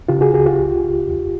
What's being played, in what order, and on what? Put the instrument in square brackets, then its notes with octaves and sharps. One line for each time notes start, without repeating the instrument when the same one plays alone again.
[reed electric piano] C#3 F4 G4
F#4 G#4
C#2 F#4 G#4
F4 G4
C#2
C#2
E2